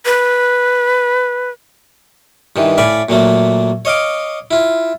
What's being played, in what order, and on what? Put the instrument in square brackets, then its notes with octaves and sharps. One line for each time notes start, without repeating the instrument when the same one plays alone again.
[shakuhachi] B4
[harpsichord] G2 D#3 E3
A2 D5 F5 G#5 B5
A#2 F#3 A3 A#3
C#5 D#5 F5 D6
E4 F4